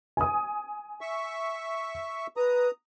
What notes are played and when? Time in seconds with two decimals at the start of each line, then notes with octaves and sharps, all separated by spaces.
0.17 G#5 D#6
1.01 E5 C#6
2.37 B4 A#5 D#6